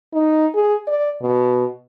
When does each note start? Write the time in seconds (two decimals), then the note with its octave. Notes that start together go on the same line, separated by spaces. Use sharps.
0.14 D#4
0.55 G#4
0.88 D5
1.22 B2